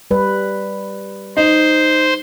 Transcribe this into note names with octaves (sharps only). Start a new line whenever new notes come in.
G3 B4
D#4 C5